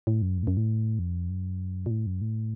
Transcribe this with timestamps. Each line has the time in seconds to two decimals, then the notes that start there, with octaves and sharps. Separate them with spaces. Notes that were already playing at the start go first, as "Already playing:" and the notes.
0.07 A2
0.22 F#2
0.38 F2
0.43 A2
0.47 F#2
0.57 A2
0.99 F2
1.29 F#2
1.86 A#2
1.91 A2
2.06 F#2
2.21 A2